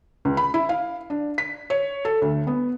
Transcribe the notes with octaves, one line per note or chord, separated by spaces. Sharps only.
C#2
B5
E4
F5
D4
B6
C#5
A4
D2
B3